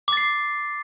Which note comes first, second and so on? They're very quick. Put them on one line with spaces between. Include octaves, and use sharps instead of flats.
D6 A6 C7